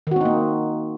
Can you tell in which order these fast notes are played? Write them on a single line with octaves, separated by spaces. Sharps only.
D#3 F#4 C4 D#4 A#3